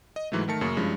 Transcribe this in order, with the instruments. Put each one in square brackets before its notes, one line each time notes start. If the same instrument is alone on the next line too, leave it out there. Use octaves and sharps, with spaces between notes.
[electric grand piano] D#5
G#2 E3 F#3 A3
D#3 A3 A#4 A5 C#7
F#2 C#3 A#3 G#4 C#6
G2 F3 G#3 C#4 E4